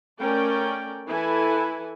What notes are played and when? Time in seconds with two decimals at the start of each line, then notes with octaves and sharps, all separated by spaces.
0.20 A3 C#4 A#4 D5 G5
1.06 E3 E4 A4 B4 G#5